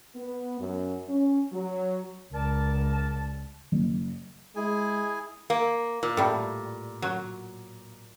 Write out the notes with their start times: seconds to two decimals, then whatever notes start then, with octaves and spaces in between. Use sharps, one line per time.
0.16 B3
0.59 F#2
1.09 C#4
1.53 F#3
2.34 C#2 A#4 D5 A5
3.72 F#1
4.56 G#3 E4 G#4 G#5
5.50 A#3
6.03 A#2
6.17 A2 G3
7.02 F#3